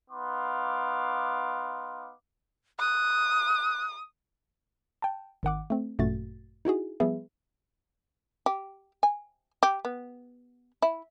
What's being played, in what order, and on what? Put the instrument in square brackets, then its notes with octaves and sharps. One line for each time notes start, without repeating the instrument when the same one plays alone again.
[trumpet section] B3 D#4 F5 C6 D6
[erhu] D#6 [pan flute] F#6
[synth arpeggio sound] G5 A5
G#1 D#3 F#5 D6
A3 C4
G#1 F#2 A#2 A3 F#4 A6
D#4 E4 F#4 G#4
F3 G3 B3 G#4 B4 E5
[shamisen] G4
G#5
G4
B3
E4